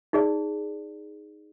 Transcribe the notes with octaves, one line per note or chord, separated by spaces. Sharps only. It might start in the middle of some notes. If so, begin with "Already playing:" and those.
D#4 G#4 D5